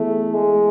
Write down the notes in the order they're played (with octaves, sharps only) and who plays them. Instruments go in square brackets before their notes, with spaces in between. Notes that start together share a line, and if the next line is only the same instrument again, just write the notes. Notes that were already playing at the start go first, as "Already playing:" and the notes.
Already playing: [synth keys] E3 B3 E4 G#4 [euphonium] A3
[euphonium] G#3